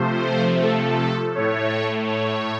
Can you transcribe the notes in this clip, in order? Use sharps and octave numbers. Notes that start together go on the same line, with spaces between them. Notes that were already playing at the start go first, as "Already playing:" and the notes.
Already playing: C3 F3 A3 C5
A4
A2 A3 C#5
C#5